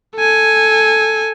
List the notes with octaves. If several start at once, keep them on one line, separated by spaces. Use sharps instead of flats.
A4 G#5